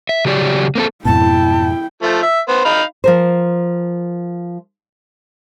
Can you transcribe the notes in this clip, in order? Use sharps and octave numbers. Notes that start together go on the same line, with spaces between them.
E5
C#3 F#3 G4 D5
A#3 C4 A4
F2 G#2 B2 E4 G5 A5
F3 A3
E5
B3 C5
D#4 F5 B5
F3 A#4 C5